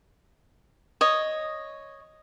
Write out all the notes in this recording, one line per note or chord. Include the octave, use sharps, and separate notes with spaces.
C#5 D#5